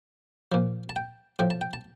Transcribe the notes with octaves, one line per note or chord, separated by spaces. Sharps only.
A#2 F3
A5
G5
A2 F3 G5
A5
G5
A5